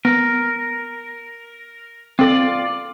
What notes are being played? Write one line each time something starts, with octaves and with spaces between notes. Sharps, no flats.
B3 A#4
C4 F4 A4 D5